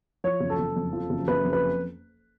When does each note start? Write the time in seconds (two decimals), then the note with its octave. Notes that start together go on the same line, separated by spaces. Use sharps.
0.24 F3 C#5
0.40 F#1
0.50 A4
0.59 F#1
0.76 F2
0.93 F3
1.10 F#1
1.28 F#1 B4
1.44 F2
1.53 B4